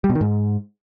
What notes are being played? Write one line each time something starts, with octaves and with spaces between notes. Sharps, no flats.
G3
B2
D#3
G#2